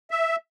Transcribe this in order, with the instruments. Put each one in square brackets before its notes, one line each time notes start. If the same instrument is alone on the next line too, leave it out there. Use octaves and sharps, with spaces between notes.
[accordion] E5